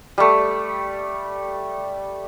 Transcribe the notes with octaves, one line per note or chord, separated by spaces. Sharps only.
G3 A3